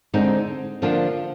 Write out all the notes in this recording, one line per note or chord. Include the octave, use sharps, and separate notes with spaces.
D3 G#3 C4 D#4
D3 F3 A#3 D4 F4